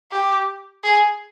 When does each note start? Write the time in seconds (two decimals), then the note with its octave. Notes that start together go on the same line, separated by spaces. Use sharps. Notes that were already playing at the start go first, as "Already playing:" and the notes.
0.12 G4
0.83 G#4